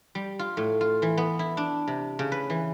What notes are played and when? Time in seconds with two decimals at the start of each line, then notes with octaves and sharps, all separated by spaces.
0.15 G3
0.39 F4
0.57 A2
0.81 F4
1.02 E3
1.17 B3
1.39 E4
1.57 D4
1.88 C3
2.19 C#3
2.32 B4
2.50 E3